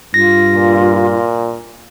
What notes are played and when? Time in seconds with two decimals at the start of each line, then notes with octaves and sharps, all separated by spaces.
0.14 G2 F4 A#6
0.54 A#2